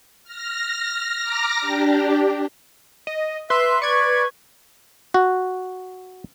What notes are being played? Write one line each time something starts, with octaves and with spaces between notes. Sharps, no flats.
F6 A#6
A#5 D6 F6 A#6
D4 G4
D#5
B4 E5 C6
D5 C#6 G#6
F#4